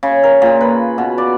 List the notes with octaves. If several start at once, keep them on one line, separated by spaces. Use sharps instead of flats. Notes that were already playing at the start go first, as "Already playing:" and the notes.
C#3
A#4
A#2
B4
B2
D5